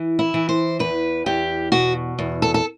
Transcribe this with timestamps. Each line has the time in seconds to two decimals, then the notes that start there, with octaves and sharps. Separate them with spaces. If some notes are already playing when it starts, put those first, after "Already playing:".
Already playing: E3
0.19 E4
0.34 E3
0.49 C5
0.79 E2 B4
1.26 E2 G4
1.72 B2 F#4
2.19 E2
2.42 A4
2.54 A4